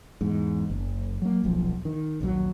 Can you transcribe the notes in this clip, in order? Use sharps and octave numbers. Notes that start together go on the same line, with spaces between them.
E2 G#2
F#1
F#3 A#3
D#1 B1 F3
D#3
A#1 D#2 C#3 F#3